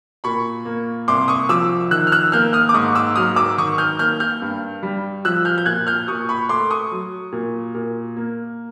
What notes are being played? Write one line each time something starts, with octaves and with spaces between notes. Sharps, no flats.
A#2 B5 C#6
A#3
C2 C6 D6
C#6 D#6
F3 D6 E6
D#3 E6 F#6
F6
E6 F#6
A#3 F6 G6
D#6 F6
D6
G#2 C#6 D#6
D6 E6
F#3 D#6 F6
D6 E6
D#3 C#6 D#6
F6 G6
A#3 F6 G6
F6 G6
G2
G3
F3 E6 F#6
F6 G6
G6
A#2 F#6 G#6
F6 G6
A#2 C#6 D#6
B5 C#6
A3 C6 D6
C#6 D#6
F#3
A#2
A#2
A#3